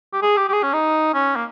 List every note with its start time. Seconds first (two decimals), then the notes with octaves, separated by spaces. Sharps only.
0.13 G4
0.22 G#4
0.37 G4
0.49 G4
0.53 G#4
0.63 C#4
0.73 D#4
1.14 C#4
1.36 A#3